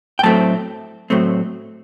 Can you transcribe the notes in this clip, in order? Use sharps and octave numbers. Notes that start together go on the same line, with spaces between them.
G5
A2 F#3 A3 C4 A5
A2 F#3 A3 C4